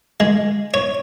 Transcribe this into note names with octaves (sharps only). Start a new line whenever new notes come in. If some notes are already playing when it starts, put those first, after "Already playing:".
G#3
C#5